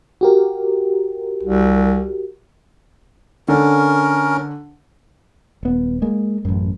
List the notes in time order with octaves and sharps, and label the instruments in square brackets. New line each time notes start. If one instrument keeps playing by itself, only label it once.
[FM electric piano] F#4 G4 A#4
[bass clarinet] C2
[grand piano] D3 [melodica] C#4 A#4
[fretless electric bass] D#1 B3
G#3 A#3
A1 F#2